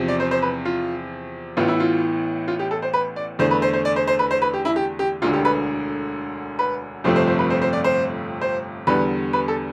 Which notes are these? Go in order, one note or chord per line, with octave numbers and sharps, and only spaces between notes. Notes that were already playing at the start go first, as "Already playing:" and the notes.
Already playing: E2 C3 F3
D5
C5
C5
B4
F4
A1 A2 E3 B3 F4
E4
F4
F4
G4
A4
C5
B4
D5
E2 D3 A3 C5
B4
C5
C5
D5
C5
C5
B4
C5
B4
G4
E4
G4
G4
E1 D2 D3 F4
G4
B4
B4
G1 F2 C3 F3 A3 C5
C5
C5
B4
C5
C5
D5
C5
C5
E2 D3 G3 B3 B4
B4
A4